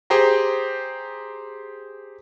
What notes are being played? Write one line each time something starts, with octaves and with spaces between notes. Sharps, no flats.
G4 G#4 C5 G5 A#5